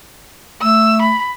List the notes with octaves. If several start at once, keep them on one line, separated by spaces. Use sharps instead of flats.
A3 E6
B5